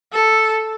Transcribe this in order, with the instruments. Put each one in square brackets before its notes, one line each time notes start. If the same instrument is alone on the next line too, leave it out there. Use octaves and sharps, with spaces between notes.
[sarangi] A4